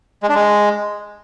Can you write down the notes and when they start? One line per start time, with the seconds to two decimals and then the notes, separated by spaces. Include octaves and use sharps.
0.23 G#3
0.29 D4
0.35 G#3